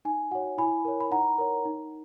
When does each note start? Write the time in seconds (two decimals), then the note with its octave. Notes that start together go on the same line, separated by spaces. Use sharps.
0.05 D#4 G#5
0.31 F#4 F#5
0.35 C#5
0.58 E4 G#5 B5
0.85 A#4 C#5
1.00 B5
1.11 D#4 F#5 A#5
1.38 A#4 C#5
1.65 D#4